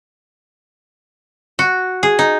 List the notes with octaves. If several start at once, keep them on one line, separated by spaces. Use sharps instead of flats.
F#4
G#4
D#4